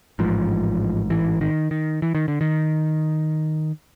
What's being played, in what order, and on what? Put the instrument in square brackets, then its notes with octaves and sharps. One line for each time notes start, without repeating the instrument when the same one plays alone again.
[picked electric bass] A1 G#2 F3
E3
D#3
D#3
E3
D#3
D3
D#3